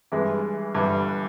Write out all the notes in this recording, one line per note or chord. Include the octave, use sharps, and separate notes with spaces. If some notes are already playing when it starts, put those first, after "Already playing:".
G2 E3 G#3
G1 G2 E3